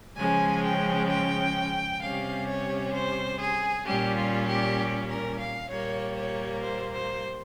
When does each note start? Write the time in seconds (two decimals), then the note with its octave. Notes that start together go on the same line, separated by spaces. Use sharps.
0.16 C#3 F3 G#3 C#4 G#5
0.63 G5
1.09 G5
2.01 C3 G3 C#4 F5
2.47 C#5
2.93 C5
3.39 G#4
3.86 A#2 G3 C#4 G4
4.16 F4
4.48 G4
5.10 A#4
5.39 F5
5.71 A#2 G3 A#3 C#5
6.16 C#5
6.63 C5
6.93 C5